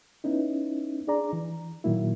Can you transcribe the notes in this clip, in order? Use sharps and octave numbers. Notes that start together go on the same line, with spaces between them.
B3 C#4 D#4 E4
D4 G#4 D5 A#5
E3
A#2 D#3 F#3 A#3 E4